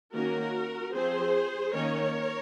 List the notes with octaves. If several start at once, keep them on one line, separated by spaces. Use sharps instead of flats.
D#3 A#3 C#4 F#4 A#4
F3 C4 G#4 C5
D#3 A#3 C#4 A#4 C#5